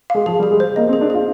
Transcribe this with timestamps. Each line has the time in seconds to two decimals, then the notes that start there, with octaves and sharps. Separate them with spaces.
0.10 G#3 F5
0.26 F3 G#4
0.39 G3
0.43 G#4
0.51 G#3
0.60 C5
0.76 A#3 D#5
0.89 C4
0.93 G#4
1.01 D4
1.10 F4 G#4